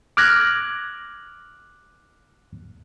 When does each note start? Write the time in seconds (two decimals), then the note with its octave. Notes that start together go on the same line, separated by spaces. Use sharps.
0.17 D6 F6 F#6 G#6 A#6